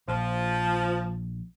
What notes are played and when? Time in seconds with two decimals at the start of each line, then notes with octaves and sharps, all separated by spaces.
0.08 A#1 F3